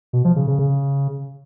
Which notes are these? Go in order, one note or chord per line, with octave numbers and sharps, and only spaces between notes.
B2
F3
C#3
C#3
C#3